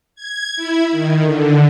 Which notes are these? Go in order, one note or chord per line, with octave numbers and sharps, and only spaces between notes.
G#6
E4
D#3
D3